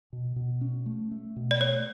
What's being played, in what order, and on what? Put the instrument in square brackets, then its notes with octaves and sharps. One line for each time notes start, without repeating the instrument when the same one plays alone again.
[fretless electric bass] B2
B2
C#4
A3
A3
B2
[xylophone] D5
[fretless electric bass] A3 [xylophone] C#5